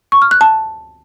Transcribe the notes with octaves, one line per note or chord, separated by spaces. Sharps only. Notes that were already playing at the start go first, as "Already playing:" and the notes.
C#6
F6
F#6
A5